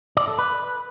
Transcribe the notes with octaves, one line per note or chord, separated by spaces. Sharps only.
D5
A4
B4